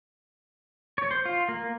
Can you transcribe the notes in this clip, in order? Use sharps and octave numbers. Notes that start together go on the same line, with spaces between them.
C#5
C5
F4
A#3